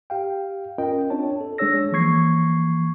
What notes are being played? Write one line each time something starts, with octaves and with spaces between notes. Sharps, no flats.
G4 F5 G5
C#4 F4 A#4 D#5 G5
C4 D4 F4 C#5 A5
A4
G#3 D4 G#4 C#5 E6 A#6
E3 F3 A#3 C#6 G#6 C7